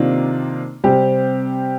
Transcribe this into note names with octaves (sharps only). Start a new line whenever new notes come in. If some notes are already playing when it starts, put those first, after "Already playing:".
Already playing: C3 D#3 A#3 D4 F4
C3 G3 C4 G4